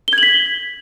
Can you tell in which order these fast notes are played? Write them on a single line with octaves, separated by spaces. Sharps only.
G7 G#6 F#7 B6